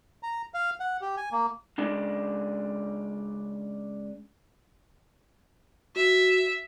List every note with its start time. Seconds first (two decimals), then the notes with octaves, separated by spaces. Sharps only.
0.23 A#5
0.54 F5
0.80 F#5
1.01 G4
1.17 G#5
1.32 A#3
1.78 C#3 G#3 D4
5.96 F#4 E5